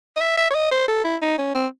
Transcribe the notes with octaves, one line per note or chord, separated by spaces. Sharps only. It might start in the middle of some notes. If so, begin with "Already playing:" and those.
D#5
E5
E5
C#5
D#5
C5
A4
E4
D#4
C#4
C4